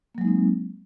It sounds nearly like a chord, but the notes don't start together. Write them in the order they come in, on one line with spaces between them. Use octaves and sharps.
A#3 F#3 G#3 D#4 C4